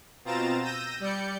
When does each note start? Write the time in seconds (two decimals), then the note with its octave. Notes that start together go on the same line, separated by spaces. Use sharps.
0.25 B2 C4 F4 A#5 A6 E7
0.63 E6 G6 A#6 D#7
1.00 G3 D5 G6 C#7